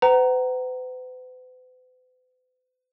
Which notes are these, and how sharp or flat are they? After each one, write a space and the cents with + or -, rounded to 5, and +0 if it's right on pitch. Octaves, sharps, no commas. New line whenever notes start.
B4 +45 F#5 +30 A#5 +0